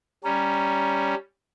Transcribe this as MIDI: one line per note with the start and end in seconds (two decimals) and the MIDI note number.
0.24 1.14 55
0.24 1.14 61
0.24 1.15 82